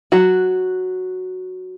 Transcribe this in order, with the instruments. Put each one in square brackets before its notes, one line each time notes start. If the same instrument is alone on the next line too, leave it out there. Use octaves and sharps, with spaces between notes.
[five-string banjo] F#3 F#4